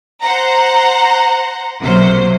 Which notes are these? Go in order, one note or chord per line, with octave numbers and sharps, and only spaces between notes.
C5 F#5 A#5
B1 C3 F#3 A#3 C5